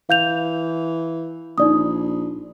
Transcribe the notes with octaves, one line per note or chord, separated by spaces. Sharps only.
E3 F5 G6 F7
A#1 D#4 D5 D#6